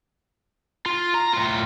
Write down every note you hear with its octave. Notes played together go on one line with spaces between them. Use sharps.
F4
A#5
A2 F4